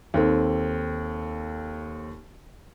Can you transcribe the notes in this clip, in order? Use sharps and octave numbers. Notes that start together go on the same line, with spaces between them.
D#2 C4 A4